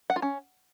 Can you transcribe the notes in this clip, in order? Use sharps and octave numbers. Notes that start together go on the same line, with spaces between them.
F#5
F4
C#4